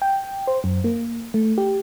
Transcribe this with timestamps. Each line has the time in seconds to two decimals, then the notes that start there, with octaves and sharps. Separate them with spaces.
0.02 G5
0.47 C5
0.64 F#2
0.84 A#3
1.34 A3
1.58 G4